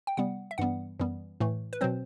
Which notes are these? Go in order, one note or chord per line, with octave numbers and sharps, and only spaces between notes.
G5
C3 G3 B3 F#5
E5
G2 E3 G3 B3 F#5
F#2 E3 G3 B3
A2 E3 A3
B4
B2 F#3 C4 C5